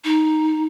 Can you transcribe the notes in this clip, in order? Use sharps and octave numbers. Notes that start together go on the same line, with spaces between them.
D#4